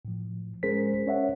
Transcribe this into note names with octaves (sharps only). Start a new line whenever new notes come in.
A2 F3
G#3 C#4 G#4 A#4 C5 B6
C#4 C#5 E5 F#5